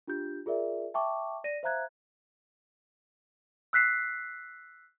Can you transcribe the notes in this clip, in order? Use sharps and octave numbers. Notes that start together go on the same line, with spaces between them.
D4 F4 G4 G6
F4 G#4 A#4 D5 E5
E5 G5 A5 C#6 D6
D5 A#6 D#7
C5 E5 F5 A#5 F#6 G#6
E6 F#6 B6 C7